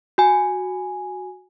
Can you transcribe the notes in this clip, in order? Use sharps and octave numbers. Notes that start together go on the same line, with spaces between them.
F#4 G#5